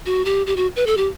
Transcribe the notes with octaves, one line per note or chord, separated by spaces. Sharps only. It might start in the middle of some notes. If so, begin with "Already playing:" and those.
F#4
G4
G4
F#4
B4
A4
G4